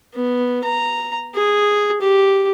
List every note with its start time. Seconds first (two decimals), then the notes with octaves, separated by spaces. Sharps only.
0.14 B3
0.64 A#5
1.35 G#4
2.01 G4